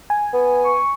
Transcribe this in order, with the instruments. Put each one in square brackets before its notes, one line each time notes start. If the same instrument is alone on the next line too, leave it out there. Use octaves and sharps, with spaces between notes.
[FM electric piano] G#5
[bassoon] B3
[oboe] C#6